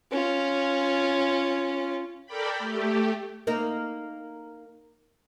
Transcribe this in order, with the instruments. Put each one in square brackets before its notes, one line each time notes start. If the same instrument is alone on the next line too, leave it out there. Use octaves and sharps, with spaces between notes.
[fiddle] C#4 F4
[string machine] A4 A#4 D5 G5 B5
A3 G4
[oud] A#3 D#4 A#4